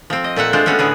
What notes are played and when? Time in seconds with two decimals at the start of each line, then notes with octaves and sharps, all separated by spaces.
0.10 F3 C4
0.24 D#5
0.36 A#2 A3 E5 F#5
0.53 G#3 D4 F4 C5
0.66 A3 B3 C#4 F#4
0.79 A2 D3 B3 G#4